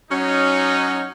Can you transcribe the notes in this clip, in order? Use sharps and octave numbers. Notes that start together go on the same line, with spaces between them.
F#3 C#4 D#4